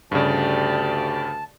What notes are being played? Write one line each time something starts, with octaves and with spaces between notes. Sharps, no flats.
D2 G2 C#3 G4 D5 A5